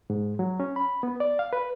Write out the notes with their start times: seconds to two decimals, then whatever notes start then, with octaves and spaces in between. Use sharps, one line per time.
0.10 G#2
0.39 F#3
0.60 C#4
0.76 B5
1.03 B3
1.20 D5
1.39 F5
1.53 B4